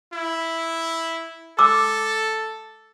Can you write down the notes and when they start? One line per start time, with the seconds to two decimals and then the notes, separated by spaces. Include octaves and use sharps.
0.13 E4
1.59 A4 D6 E6